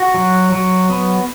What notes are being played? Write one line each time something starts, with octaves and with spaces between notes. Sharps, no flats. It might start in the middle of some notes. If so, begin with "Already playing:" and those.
Already playing: F#4
F#3
F#3
B3